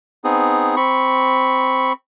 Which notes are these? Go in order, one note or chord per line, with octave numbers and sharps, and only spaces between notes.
B3 C4 D#4 G#4
C4 B5 C#6